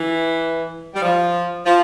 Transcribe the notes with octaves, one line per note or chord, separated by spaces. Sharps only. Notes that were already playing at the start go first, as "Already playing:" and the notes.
Already playing: E3
G3
F3
F3